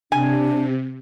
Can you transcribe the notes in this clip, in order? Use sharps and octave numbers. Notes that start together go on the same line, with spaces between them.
C3 D4 G#5